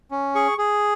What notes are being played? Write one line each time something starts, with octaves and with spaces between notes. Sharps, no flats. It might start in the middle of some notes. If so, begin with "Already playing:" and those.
C#4
G#4 C#6
G#4